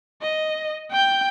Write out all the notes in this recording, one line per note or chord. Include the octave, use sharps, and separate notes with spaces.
D#5
G5 G6